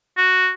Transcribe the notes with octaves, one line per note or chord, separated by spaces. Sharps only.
F#4